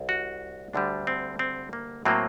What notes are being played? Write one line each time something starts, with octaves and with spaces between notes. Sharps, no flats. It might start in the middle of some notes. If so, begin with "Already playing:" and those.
Already playing: C2
F#4
D2 D3 G3 D4
C4
C4
A#3
A2 F#3 A#3 C4